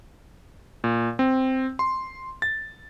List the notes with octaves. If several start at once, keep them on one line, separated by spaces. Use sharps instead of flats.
A#2
C4
C6
A6